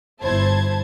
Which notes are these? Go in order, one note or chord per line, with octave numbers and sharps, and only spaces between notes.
G1 E4 C5 A5 G#6